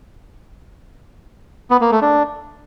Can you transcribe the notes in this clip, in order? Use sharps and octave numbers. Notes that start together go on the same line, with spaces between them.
B3
A#3
A3
D4